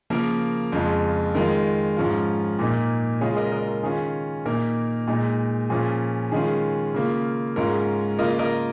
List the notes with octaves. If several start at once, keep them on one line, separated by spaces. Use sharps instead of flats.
C#3 F3 A#3 A#4
F2 C#3 G#3 F4
D#3 G#3 F4 A#4
G#2 F3 C#4 F4
A#2 A#3 D#4
C#3 G#3 F4 G#4 C#5
A#4 D#5
A#4 D#5
A#4
D#3 C#4 F4 G#4
A#2 A#3 D#4 A#4
A#2 G#3 D#4
A#2 F3 C#4 F4 G#4
D#3 G#3 C#4 F4 G#4
C#3 A#3 F4
G#2 G#3 C#4 F4 A#4
C#3 A#3 F4 A#4 D#5
A#4 D#5